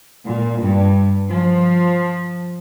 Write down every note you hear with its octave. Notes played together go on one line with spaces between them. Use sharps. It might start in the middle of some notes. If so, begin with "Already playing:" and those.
A#2
G2
F3